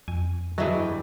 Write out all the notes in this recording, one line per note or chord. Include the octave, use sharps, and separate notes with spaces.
F2 G#5
G2 E3 F#3 G3 G#4 D#5 E5